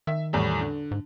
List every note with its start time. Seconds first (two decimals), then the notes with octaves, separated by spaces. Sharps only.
0.07 D#3 E5
0.33 E2 A2 G3
0.61 D3
0.91 G#2